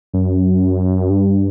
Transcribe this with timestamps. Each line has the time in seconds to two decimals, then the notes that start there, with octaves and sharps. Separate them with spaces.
0.14 F#2
1.10 G2